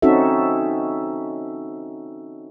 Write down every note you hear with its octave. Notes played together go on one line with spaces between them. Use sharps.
C4 C#4 D#4 F#4 A4 E5